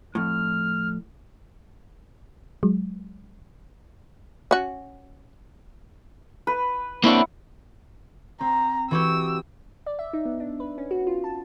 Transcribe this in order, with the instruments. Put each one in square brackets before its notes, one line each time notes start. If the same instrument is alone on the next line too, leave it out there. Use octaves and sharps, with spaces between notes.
[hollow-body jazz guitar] F2 A2 [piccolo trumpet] F6
[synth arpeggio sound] F#3 G#3
[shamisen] C#4 F#4
[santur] B4
[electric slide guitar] A#3 C4 D4 [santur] E4 C#5 F#5
[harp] C4 [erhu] A#5
[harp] E3 F#4 G4 [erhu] E6
[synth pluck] D5
E5
D#4
B3
D4
B4
C#4
F#4
F4
A5